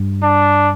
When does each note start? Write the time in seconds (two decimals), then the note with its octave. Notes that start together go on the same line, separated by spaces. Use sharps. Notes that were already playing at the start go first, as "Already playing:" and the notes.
Already playing: G2
0.23 D4